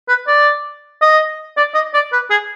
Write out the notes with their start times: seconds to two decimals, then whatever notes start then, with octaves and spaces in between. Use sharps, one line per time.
0.09 B4
0.27 D5
1.02 D#5
1.57 D5
1.74 D#5
1.94 D5
2.12 B4
2.30 G#4